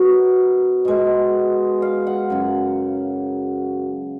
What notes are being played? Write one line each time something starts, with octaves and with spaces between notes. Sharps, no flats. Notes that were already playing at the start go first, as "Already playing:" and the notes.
Already playing: B2 F#3 A#4
B2 G#3
F5
F#5
F#2 C#3 F#3